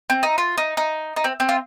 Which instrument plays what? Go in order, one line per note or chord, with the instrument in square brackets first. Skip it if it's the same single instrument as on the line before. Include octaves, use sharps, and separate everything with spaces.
[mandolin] C4
D#4
F4
D#4
D#4
D#4
C4
C4
F4